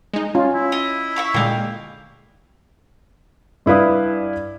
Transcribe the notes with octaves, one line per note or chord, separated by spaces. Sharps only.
G#3 D#4
C#4 F4
E4
D#5
E5 F5 C#6
A#2 D3 G#3 G4 F5
G2 E4 B4 F5 D#6